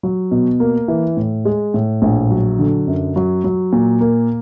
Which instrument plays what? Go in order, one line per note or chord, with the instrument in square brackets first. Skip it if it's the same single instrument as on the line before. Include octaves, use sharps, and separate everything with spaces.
[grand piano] F#3
B2
A#3
E3
A2
G#3
A2
A#1
F#3
D3
F#2
F#3
F#3
A#2
A#3